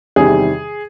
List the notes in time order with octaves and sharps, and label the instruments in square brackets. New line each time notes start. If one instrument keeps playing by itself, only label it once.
[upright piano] E2 C3 D#3 G3 G#4